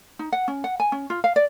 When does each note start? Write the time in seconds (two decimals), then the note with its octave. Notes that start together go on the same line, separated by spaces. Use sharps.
0.19 D#4
0.32 F#5
0.48 C#4
0.64 F#5
0.80 G#5
0.92 C#4
1.10 F4
1.24 F5
1.36 D5